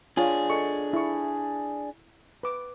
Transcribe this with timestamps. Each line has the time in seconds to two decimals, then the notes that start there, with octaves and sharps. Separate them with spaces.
0.17 D4 F4 G#4 C#5
0.50 A4 D#5 C#6
0.93 E4 C#6
2.43 B4 D6